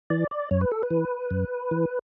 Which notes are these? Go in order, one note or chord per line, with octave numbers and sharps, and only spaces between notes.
E3 D5
D5
F#2 C#5
B4
A4
B4
E3
F#2
E3